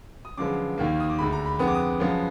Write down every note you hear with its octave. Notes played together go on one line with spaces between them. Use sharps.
D#6
F#2 D3 F3 G#3 B3 D6
D#2 D#3 A#3
D#6
D6
D2 D3 G#3 B5
A#5
B5
F2 D3 G#3 B3 D#6
D6
D#6
F#2 F3 G#3 B3